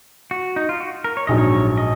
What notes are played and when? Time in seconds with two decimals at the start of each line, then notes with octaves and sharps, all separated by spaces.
0.31 F#4
0.56 D#4
0.69 F4
0.80 F#4
1.04 A#4
1.17 C#5
1.27 A#1 G#2 F#3 D#5
1.38 C#5
1.77 D#5